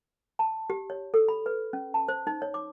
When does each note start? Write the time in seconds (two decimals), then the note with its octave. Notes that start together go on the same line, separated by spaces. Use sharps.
0.39 A5
0.70 G4
0.90 C#5
1.14 A4
1.28 B5
1.46 B4
1.73 C#4
1.94 A5
2.09 C5
2.27 D#4
2.42 C#5
2.54 D6